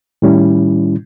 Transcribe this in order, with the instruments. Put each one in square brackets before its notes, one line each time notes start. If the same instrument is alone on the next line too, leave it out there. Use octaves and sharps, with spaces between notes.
[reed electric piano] A2 D#3 G3 C#4 E4